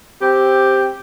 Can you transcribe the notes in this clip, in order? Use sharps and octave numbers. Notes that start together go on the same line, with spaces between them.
C4 G4